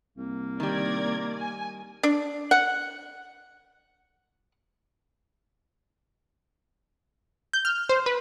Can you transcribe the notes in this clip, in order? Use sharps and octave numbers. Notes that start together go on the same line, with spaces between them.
C2 A#3
D#3 G3 D5 A#5 G#6
G#5
D4
F#5
G6
F6
C5
B4